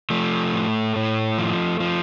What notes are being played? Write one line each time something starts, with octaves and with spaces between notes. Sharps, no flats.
F3 A3
A2
A2
F3
F3